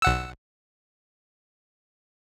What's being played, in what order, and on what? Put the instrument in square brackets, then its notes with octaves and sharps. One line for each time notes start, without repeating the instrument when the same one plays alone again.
[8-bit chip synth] B1 F#5 E6